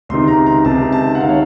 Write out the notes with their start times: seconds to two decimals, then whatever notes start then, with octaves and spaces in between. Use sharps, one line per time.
0.09 C#2 C3 D#3 C6
0.28 A#5
0.46 A#5
0.65 C#2 C3 D#3 A5
0.92 A5
1.15 F#5
1.20 C3 D#3 F5
1.29 C#5